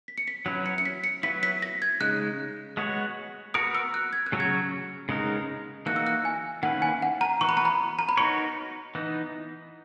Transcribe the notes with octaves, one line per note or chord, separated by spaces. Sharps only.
B6
C#7
B6
F#3 C#4 E4 B4 B6
C#7
C#7
B6
C#7
F#3 B3 E4 B4 B6
B6
A#6
G#6
C#3 G#3 D#4 F#6
G#3 B3 F#4 C#5
B3 F#4 A#4 D#6
E6
F#6
G#6
F#6
C#3 F#3 C#4 F#4 C#5
G#6
C#3 G#3 B3 D#4 A#4
E3 A#3 D#4 F#4 F#6
E6
F#6
G#5
D#3 A#3 C#4 E4 B4 F#5
G#5
F#5
A#5
E3 B3 F#4 C#6
B5
A#5
B5
A#5
B5
B3 D#4 F#4 A#4 C#5 C#6
E3 B3 D#4